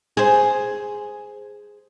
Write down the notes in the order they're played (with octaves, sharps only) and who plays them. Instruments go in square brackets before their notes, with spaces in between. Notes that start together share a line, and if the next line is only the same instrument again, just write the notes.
[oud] G#4 C5